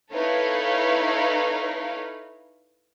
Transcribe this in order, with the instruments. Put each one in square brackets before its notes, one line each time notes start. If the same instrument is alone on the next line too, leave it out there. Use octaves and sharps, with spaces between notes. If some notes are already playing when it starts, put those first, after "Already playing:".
[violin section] D#4 E4 A4 B4 C#5 F5